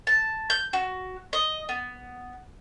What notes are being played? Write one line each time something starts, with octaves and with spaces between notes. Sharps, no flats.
A5
G6
F#4
D#5
B3